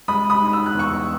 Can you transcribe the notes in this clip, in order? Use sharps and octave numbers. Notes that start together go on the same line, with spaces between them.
G#3 B5 D#6
B5 D#6
D#4
E6
F#6
E2 C#6 E6